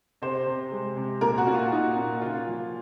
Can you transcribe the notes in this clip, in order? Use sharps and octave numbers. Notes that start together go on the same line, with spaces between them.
C3 C5
C3
G#3
C3
A#2 A#4
F#4
A#2
F4
A#2 D#4
A#2
C#3 F4
F3